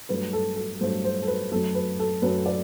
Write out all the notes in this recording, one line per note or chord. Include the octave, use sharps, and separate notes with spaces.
G2 F#3 A3 B4
A4
A4
G2 F#3 A3 C5
C5
A4
B4
F#2 F#3 A3 A4
B4
A4
F#2 F#3 A3 B4
D5